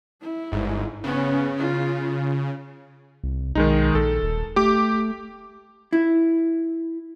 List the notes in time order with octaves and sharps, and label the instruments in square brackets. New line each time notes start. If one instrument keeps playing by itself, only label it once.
[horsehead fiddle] E4
[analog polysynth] G1 G#2
[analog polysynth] C#3 [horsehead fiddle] B3 C#4
[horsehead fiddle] F4
[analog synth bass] C2
[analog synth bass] B1 [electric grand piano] D#3 G#3 D#4
[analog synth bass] A#1 [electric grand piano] A4
[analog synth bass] D#1
[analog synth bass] A3 [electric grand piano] G4 D6
[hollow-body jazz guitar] E4